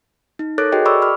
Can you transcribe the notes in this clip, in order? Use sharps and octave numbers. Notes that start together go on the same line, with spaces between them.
D#4
A4 A#4 C#5 D6 F#6 A6
F#4 G#4 A#4 D#5 G5
D5 B5 C#6 D6 E6
B5 D6 F6